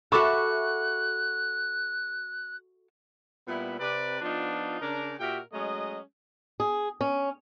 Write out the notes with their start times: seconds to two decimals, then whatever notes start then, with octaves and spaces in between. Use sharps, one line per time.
0.12 F#4 A4 E5 B5 C#6 D6 F#6
3.48 A#2 G3 B3 E4
3.79 C3 B4 D5
4.22 F3 B3 D4 D#4 F4
4.82 C#3 D4 A#4
5.20 A#2 F#4 G4 A#4 E5 G5
5.52 F#3 G#3 A3 C#4 D#5
6.60 G#4
7.01 C#4